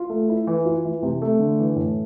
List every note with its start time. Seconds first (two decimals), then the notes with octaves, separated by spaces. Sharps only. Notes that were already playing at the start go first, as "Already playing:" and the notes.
Already playing: F4
0.09 A3
0.29 E4
0.47 E3
0.65 F4
0.85 E3
1.03 C3
1.22 A3
1.39 D3
1.59 E3
1.76 A2